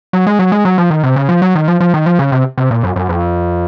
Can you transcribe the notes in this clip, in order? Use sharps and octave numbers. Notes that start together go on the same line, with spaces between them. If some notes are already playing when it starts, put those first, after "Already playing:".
F#3
G#3
F#3
G#3
F#3
F3
D#3
C3
C#3
F3
F#3
D#3
F3
F3
D#3
F3
C#3
C3
C3
A#2
F#2
F#2
F2